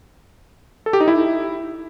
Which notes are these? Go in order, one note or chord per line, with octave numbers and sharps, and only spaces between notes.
A4
G4
D#4
E4